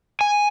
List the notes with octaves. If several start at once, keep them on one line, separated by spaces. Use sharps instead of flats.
G#5